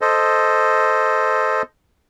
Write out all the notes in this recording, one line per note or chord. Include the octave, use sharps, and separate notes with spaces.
A4 C5 D#5